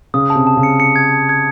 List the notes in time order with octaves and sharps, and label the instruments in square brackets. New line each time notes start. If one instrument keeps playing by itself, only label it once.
[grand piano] C#3 [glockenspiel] D#6
[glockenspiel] A5
[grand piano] C3
[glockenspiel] A5
[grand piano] C#3
[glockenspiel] C#7
C#7
G#6
A5
G#6